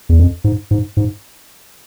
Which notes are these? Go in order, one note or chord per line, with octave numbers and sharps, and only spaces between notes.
E2
F2
G#2
G#2
G#2